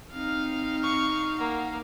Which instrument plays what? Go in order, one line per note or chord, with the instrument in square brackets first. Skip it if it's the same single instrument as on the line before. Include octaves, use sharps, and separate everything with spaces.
[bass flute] C4 [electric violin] D#4 F5
[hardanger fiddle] C#6
[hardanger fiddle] A#3 [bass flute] F#5